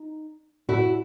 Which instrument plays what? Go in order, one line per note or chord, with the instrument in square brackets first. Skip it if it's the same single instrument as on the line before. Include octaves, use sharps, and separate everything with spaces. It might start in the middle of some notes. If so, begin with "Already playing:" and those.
Already playing: [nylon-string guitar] D#4
[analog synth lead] A2 [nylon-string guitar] E4 F#4